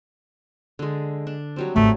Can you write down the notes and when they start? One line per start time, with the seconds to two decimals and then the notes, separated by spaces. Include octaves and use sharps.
0.79 D3 G#3
1.27 D4
1.56 F#3 G3 C4
1.76 G#1 D#3 A3